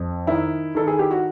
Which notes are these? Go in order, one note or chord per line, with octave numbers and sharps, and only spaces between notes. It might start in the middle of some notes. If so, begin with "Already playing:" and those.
Already playing: F2
D#3 E4
D#3 A4
G#4
G4
F#4